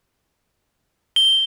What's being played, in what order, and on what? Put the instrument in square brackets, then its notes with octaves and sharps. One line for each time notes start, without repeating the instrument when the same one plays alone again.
[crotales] G7